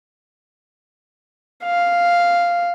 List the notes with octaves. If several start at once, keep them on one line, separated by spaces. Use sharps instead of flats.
F5